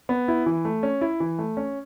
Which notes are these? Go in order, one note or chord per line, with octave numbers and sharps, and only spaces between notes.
B3
E4
E3
A3
C#4
E4
E3
A3
C#4